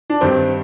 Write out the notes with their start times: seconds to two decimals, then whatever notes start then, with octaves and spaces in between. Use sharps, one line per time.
0.10 D4
0.21 G2 D#3 G3 C4